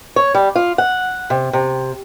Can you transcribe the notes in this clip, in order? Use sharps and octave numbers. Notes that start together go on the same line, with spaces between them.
C#5
G3
F4
F#5
C3
C3